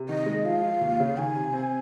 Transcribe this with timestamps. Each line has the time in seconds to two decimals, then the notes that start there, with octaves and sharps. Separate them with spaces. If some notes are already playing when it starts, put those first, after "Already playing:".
Already playing: C3
0.09 D#3 D#5
0.26 G#3
0.45 F3 F5
0.63 F4
0.81 D#2
1.00 C#3
1.17 D#3 G#5
1.35 C3
1.53 C4